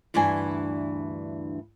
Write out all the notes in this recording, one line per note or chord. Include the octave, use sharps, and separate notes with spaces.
D2 G2 E3 D4 G#5